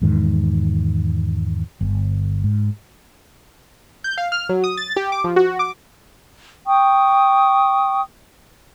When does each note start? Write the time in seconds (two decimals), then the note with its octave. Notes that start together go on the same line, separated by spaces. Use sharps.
0.01 E2 G#2 D#3
1.81 G1
2.44 G#2
4.04 G6
4.18 F5
4.32 F6
4.49 F#3
4.64 D#6
4.77 A6
4.96 G4
5.12 D6
5.24 F3
5.36 F#4
5.59 D6
6.67 G5 C#6 D#6